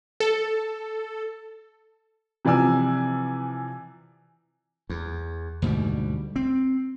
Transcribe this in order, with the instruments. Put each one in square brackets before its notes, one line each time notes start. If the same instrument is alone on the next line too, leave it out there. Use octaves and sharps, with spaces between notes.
[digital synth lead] A4
[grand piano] C3 E3 F3 D5 G#5 E6
[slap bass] E2
D2 G#2 B2 G3
C4